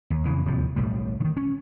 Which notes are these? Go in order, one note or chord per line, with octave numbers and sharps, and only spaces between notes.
D#2
F2 C#3 E3
D1 D#2 C3 F3
B1 A2 G3
D3 D#3
C#4